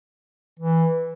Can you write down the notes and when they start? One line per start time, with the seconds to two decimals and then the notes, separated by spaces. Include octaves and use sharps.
0.59 E3